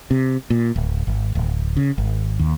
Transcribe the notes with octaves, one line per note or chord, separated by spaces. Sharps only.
C3
A#2
D1
G#1
D1
C#3
G#1
D#2